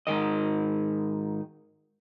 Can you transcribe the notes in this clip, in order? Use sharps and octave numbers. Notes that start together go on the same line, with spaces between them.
G#2 C3 D#3 D#5